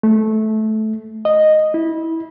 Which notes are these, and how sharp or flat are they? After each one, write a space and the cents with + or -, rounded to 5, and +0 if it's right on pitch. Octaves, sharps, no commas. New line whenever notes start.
A3 -15
D#5 -10
E4 -20